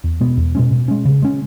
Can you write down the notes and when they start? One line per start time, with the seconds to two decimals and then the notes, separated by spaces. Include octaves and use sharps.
0.04 E2
0.21 B2 G#3 B3
0.37 E2
0.55 B2 G#3 C#4
0.72 B2
0.88 G#3 C#4
1.05 C#3
1.22 G#3 C#4